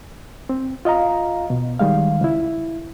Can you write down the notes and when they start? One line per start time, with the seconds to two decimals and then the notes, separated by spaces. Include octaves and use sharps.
0.49 C4
0.85 F4 D#5 F5 A#5
1.50 B2
1.79 D#3 G3 G#3 F5
2.21 C#2 E4